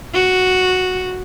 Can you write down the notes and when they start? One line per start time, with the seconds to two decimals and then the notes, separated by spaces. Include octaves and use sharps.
0.14 F#4